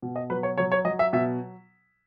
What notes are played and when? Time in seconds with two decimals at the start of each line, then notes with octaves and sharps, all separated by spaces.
0.02 B2
0.16 D#5
0.30 F#3 B4
0.43 C#5
0.58 F#3 C#5
0.72 C#5
0.85 F#3 D#5
0.99 E5
1.13 B2 E5